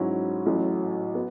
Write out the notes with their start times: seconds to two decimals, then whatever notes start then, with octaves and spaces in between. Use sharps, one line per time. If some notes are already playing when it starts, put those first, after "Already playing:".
Already playing: G#2 F#3 C#4 E4
0.46 A1 A2 F#3
1.15 B3